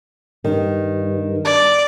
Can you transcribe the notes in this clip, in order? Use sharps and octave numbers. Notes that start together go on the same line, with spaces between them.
G2 D#3
D5